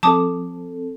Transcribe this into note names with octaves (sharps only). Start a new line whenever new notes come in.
F3 C4 A4 A5 D6 D#6